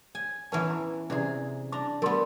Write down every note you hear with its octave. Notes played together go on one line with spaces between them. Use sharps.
G#5
E3 B3 C#4 B4 A5
A#5
C3 E3 C#4 G#4 D5 A#5
D4 A#5 D6
G3 B3 A#4 C6